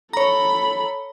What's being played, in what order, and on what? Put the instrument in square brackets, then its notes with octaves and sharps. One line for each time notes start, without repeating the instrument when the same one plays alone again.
[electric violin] A4 B5 [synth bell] C#5 A#5